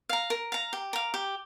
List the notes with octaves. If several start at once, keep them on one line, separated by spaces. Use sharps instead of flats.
F5 A#5
A#4
F5 A#5
G4
A#4 F5
G4